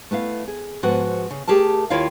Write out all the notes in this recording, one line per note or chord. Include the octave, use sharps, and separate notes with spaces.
A3 B3 E4 F5
G#4
G#2 F3 B3 F#4 B4 F#5
C#3
A3 G4 G#4 A#4 A5
D#2 E4 F4 C#5 D#5 F5